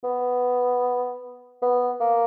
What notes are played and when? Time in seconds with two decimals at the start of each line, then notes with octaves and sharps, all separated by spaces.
0.04 B3
1.62 B3
2.00 A#3